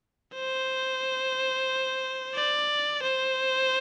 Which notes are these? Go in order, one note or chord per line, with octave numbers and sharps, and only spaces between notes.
C5
D5
C5